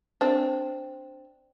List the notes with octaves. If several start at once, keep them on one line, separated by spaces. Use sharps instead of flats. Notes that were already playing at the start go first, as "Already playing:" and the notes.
C4 D4